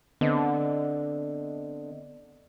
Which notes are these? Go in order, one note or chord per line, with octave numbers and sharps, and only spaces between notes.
D3 B3 C4 D#5